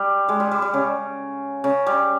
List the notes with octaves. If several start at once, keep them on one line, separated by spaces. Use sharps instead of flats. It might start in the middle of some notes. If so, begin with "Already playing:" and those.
Already playing: G3
G#3
G3
G3
G3
C#3
C#3
G3